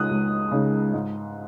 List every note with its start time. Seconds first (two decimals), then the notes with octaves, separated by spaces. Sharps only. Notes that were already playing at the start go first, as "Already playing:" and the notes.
Already playing: C#2 C#3 G#3 D#4 D#6 F#6
0.10 C#2
0.51 C#3 G#3 D#4
0.94 G#2